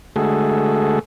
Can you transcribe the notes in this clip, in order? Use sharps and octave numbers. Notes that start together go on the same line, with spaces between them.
D3 G#3 A3 F#4 G#4 A4